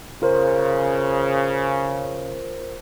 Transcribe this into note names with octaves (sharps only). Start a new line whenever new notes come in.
C#3 F4 A#4 C5